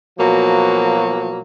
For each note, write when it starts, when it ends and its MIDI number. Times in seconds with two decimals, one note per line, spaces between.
0.19 1.40 47
0.19 1.40 53
0.19 1.40 54
0.19 1.40 58